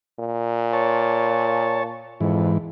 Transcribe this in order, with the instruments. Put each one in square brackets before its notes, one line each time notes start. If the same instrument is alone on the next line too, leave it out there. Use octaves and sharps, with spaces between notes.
[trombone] A#2
[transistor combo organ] C#5 A5
[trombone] F2 [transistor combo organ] G#2 E3